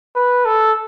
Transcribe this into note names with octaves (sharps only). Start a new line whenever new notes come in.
B4
A4